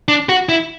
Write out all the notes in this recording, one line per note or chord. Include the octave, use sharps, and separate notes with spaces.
D4
F#4
E4